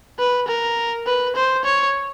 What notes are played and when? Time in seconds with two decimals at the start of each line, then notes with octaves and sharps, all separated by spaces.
0.19 B4
0.48 A#4
1.07 B4
1.36 C5
1.65 C#5